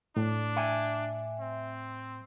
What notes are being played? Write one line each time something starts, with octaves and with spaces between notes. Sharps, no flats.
A2 D4
E5 G5 G#5
C4